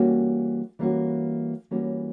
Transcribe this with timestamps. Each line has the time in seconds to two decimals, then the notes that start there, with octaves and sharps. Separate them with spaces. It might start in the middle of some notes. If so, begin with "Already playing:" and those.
Already playing: E3 G3 A#3 C#4 F#4
0.79 E3 G3 A#3 C#4 F#4
1.71 E3 G3 A#3 C#4 F#4